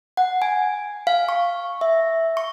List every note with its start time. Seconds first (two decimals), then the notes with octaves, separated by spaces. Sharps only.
0.17 F#5
0.42 G#5
1.07 F5
1.29 C#6
1.81 E5
2.37 C#6